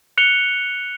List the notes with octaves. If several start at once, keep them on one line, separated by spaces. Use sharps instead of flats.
F#6 C#7 F7 G7